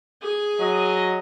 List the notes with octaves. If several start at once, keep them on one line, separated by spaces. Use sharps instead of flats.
G#4 G#5
F#3 D#5